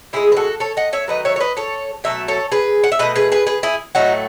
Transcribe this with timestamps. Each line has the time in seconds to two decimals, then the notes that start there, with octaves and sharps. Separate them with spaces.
0.13 A2 E3 G#3 E4 G#4
0.32 B4
0.37 F#4 A4
0.60 A4 C#5
0.77 D#5 F#5
0.93 C#5 E5
1.08 D#3 F#3 A3 B4 D#5
1.25 C#5 E5
1.36 C#5
1.40 B4 D#5
1.57 A4 C#5
2.04 B2 F#3 A3 E5
2.28 A4 C#5
2.52 G#4 B4
2.84 F#5
2.92 E5
2.99 B2 A3 B4 D#5
3.16 G#4 B4
3.32 G#4 B4
3.47 G#4 B4
3.63 E4 G#4
3.95 A2 F#3 A3 D#4 F#4